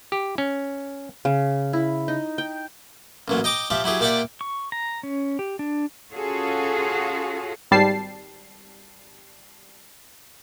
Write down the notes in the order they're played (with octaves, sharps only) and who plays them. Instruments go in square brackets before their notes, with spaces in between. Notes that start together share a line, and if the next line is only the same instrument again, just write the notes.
[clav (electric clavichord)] G4
C#4
[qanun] C#3
E4
D#4
G5
[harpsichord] A1 A#2 F#3
D#5 G5 A#5 D6 D#6
F3 G4 E5
F#3 E4 G4 G#4
A#2 G4 D5 E5 F#5 G5
[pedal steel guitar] C#6
A#5
C#4
G4
D4
[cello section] C#4 F4 F#4 G#4 A4
[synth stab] G#1 G3 A5 C7